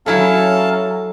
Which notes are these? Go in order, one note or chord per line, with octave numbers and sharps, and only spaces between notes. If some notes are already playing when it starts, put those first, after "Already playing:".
F#3 C#4 E4 A4 F5 A5